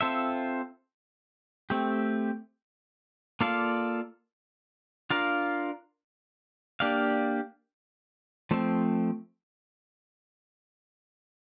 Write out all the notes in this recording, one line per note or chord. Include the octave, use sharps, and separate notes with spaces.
C4 F4 A4 E5
A3 C4 G4
A#3 F4 A4 D5 F5
D4 F4 A#4 F5
A#3 D4 G4 D5 F5
F3 A3 C4